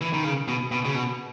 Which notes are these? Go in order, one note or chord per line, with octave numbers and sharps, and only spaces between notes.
E3
D#3
C#3
B2
B2
C#3
B2